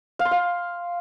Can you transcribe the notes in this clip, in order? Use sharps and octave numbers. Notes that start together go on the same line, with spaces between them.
F5
C6
F5